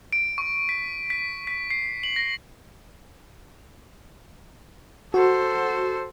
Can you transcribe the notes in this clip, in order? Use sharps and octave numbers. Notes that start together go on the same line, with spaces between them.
D7
C#6
B6
B6
B6
C7
F#7
A#6
F#4 A4 C5